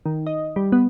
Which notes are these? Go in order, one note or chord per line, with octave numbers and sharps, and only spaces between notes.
D#3
D#5
G3
B3